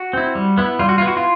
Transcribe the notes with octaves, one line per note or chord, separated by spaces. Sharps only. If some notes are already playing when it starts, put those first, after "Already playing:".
Already playing: F#4
C4 E4
G3
B3 E4
G3 F4
F#4
B3 E4 F4
F#4
F4